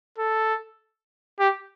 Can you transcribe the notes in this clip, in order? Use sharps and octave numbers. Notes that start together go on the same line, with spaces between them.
A4
G4